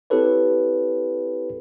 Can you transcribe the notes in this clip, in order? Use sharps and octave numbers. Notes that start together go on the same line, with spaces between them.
C4 E4 G4 A4 B4 C#5